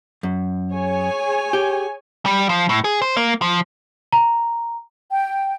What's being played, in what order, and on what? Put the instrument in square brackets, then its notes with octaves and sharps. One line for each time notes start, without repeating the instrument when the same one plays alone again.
[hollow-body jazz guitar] F#2
[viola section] G#4 C#5 G#5
[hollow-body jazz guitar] G4
[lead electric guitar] G3
F3
A2
G#4
C5
A#3
F3
[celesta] A#5
[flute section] G5